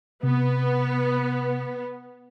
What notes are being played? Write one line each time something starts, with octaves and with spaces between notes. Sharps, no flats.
C3 B3